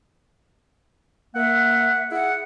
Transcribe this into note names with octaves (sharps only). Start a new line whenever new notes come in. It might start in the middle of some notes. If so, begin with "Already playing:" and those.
A#3 E5 F#5
E4 G#4 F#5